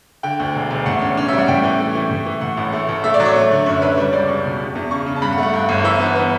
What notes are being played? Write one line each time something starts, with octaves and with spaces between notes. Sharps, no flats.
D3 G5
D2
E1
E1
A2 F#5
C#4
C#4
G3 E5
F#5
A2 G5
E3
A3
E3
A2
E3
A2 F#5
A1
A3
A1
A3 E5
D5
F#3
C#5
A3
D3
F#2 C#5
D4 B4
G3 C#5
C#2 D5
C#2 C#6
B2
E2
E2
C#3 C#6
C#3
A5
G2 B5
F#5
A3
F#5
G2
G1
E3 E5
B3
B3